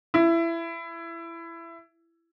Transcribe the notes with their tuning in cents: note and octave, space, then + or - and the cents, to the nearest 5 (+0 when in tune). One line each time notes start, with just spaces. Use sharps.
E4 +20